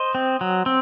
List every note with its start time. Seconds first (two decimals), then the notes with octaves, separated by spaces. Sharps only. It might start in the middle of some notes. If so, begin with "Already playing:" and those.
Already playing: C5 D#5
0.15 C4
0.41 F#3
0.66 C4